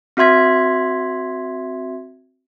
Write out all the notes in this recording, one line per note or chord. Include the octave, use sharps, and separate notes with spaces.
C4 F#4 E5 C6 G#6 B6